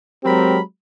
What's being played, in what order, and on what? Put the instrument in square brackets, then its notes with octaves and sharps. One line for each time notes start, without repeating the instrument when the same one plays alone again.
[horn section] F#3 G#3 C4 G4 A#4 B5